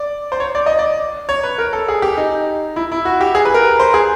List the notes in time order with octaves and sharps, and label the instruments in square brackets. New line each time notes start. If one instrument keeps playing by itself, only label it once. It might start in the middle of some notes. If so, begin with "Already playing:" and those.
Already playing: [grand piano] D5
C5
C#5
D5
D#5
D5
C#5
B4
A#4
A4
G#4
G4
D#4
E4
E4
F#4
G4
G#4
B4
A#4
C5
G#4